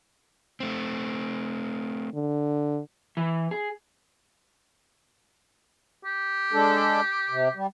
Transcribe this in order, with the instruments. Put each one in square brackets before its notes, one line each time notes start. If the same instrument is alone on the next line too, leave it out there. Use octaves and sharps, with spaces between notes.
[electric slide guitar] A3 C4
[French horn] D3
[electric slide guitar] E3
G#4
[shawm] G4
[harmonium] G#3 D4 A4
C3
G3